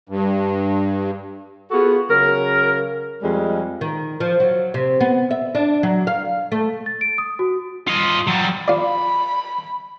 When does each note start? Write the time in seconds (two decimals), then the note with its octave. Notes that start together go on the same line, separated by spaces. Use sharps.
0.09 G2
1.71 B3 F4 F#4 G#4 A4
2.10 C#3 F#3 A#4
3.22 F2 G3 G#3
3.81 D#3
4.20 F3
4.40 F#3
4.74 C3
5.01 B3
5.31 E5
5.55 D4
5.83 F#3
6.07 F5
6.52 A3
6.86 A6
7.01 D7
7.18 D#6
7.39 F#4
7.87 F4 D#5
8.27 F#3 G3
8.68 F4 D5 B5